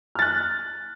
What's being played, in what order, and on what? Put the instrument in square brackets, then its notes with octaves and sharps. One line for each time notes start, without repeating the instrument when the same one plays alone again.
[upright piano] F6
A6
F#6